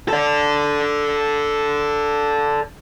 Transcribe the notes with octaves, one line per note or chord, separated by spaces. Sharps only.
A4 D5